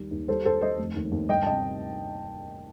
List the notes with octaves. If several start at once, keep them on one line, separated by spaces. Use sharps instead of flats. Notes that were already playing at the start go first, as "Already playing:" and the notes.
Already playing: D#2 D#3 G3
D#2
G3 A4 C5
D#2 A4 C5
G3 C5 D#5
F1
D#2
D#2
G1 D#5 G5
A5
C3 D#5 G5